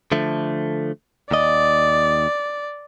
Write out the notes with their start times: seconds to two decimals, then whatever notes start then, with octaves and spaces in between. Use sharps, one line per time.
0.12 D3 F3 A3
1.31 D#2 D5 D#5